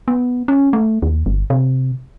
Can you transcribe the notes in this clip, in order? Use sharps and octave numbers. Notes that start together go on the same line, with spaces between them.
B3
C#4
A3
D#2
G1
C3